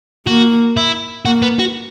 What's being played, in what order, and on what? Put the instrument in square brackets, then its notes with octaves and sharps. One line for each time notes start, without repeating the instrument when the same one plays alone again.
[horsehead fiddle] A#3 [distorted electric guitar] F#4
[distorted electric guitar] E4
[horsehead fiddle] A#3 [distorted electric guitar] F#4
[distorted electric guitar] B3
F#4